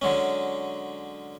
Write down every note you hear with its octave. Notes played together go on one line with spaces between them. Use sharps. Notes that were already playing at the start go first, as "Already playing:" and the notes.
D3 F#3 G#3 C#4